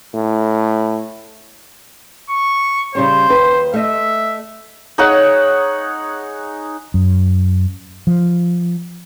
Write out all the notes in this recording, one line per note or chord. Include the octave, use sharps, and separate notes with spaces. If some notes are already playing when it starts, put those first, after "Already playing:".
A2
C#6
C#3 G3 C#4 C5
D#2 B4
A3 D#5 E5
D#4 G#4 C#5 F#5
F#2
F3